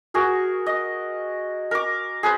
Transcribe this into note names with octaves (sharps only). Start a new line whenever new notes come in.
F#4 G#4 A#4
D#5
A#4 D6
G#4 B4 C5